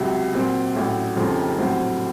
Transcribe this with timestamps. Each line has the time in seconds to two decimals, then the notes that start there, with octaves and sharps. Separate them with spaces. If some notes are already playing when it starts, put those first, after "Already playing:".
Already playing: C#2 C3 F#3
0.34 A#2 F#3 C4
0.75 A1 A2 F#3 A3
1.16 F1 D#2 C#3 F3 C4
1.58 A#1 A2 F#3 C4